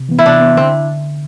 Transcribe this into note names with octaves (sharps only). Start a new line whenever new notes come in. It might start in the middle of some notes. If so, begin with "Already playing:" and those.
Already playing: C3
E3 B3
E4
C3 D4
E3 B3
D3 C4